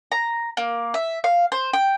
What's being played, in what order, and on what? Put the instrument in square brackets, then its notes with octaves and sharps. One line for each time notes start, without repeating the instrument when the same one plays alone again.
[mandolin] A#5
A#3
E5
F5
C5
G5